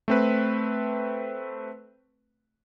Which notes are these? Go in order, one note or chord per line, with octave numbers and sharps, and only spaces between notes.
A3 C4 B4